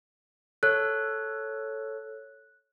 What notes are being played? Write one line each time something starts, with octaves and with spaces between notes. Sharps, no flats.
A4 C#5 F#6